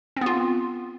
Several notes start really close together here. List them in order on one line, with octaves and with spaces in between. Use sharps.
C4 B3 F4